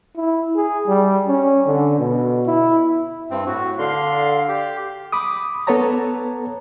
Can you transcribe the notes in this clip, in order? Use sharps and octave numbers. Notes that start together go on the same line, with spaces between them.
E4
G#4
G3
C#4
D3
B2
E4
G2 C4
A2 F#4
D3 F5 C6
G4
B5 D6 D#6
B3 A4 B4 C#5 A5 A#5